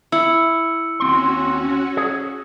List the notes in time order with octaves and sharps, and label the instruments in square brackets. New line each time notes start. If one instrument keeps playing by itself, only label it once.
[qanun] E4 [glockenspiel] E6 C#7 F#7
[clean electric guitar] D#2 C4 C6 [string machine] C#4 F#4
[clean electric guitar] G#4 C#5